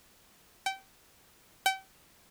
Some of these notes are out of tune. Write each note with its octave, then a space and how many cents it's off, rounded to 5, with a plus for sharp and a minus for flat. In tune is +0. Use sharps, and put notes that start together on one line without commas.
G5 -25
G5 -35